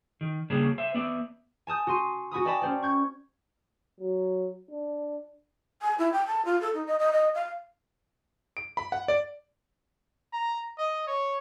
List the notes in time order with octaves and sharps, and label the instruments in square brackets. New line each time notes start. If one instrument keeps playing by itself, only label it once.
[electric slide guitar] D#3
C#3 G3 A#3 D4 G#4 C#5
C5 E5
B3 D5 E5
[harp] G#5 A5 D#6 G6
F#4 C6 D#7
F#4 G#5 B5 D#6
D5 D#5 G5 A5 B5 D#6
C#4 C5 D5
C#6 G6 G#6
[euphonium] F#3
D4
[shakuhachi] G#5
E4
G5
A5
F4
A4
D#4
D#5
D#5
D#5
F5
[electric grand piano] D7
B5
F#5
D5
[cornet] A#5
D#5
C#5